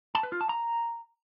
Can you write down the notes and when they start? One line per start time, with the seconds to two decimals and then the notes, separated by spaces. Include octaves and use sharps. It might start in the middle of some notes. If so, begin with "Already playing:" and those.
0.15 A5
0.23 B4
0.32 F4
0.41 A5
0.49 A#5